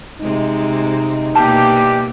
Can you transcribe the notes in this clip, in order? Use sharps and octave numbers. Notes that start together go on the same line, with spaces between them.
C3 G#3 D#4
B2 E3 G3 A#3 G4 A5